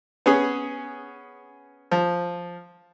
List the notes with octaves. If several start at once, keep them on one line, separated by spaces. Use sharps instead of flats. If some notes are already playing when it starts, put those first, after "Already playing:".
B3 C#4 G#4
F3